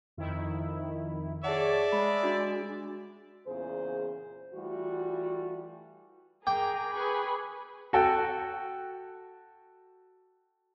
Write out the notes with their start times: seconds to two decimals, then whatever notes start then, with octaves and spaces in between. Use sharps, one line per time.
0.17 F2 D#3 E4
1.44 G#4 C#5 D5 E5 F#5 A5
1.92 G#3 B5
2.23 D4 F#4
3.47 E2 A#2 C#3 G#4 C5
4.54 E3 G3 A3 F4 F#4
6.47 G#4 A#4 G5 A#5 D6
6.94 G#4 B4 G#5 B5 C#6
7.93 F#4 A4 G5